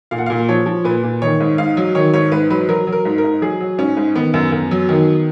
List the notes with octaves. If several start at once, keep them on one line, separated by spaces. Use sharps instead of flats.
A#2 F5
F#5
A#2 F5
F3 C#5
F3
A#2 B4
A#2
D#3 C#5
G#2
G#2 F5
F#3
D#3 C#5
G#2 C#5
G#2 B4
F#3 B4
F#3 A#4
F#3
A#4
G#2
A#4
G#2
F#3 G#4
F#3
G#2 C#4
G#2
D#3 B3
F#2
F#2
F#3
D#3